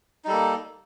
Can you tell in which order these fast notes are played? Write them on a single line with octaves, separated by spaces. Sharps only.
D#4 G3 A4 A#3